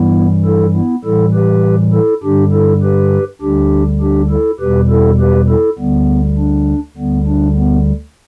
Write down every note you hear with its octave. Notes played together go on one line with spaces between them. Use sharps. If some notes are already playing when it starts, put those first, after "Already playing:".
Already playing: G2 E3 G3 B3 E4
E4 A4
B3 E4
A2 E3 G3 E4 A4
G4 B4
E4 A4
G2 D3 G3 D4 G4
E4 A4
G4 B4
D2 D3 G3 D4 G4
D4 G4
E4 A4
E2 B2 G3 G4 B4
E4 A4
G4 B4
E4 A4
D2 D3 G3 B3
D4
D2 D3 G3 B3
D4
B3